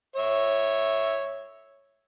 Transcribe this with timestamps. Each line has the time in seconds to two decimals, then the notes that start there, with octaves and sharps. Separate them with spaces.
0.16 C#5 E5